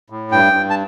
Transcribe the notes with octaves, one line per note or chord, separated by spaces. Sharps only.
A2
G2 G5
G2
A5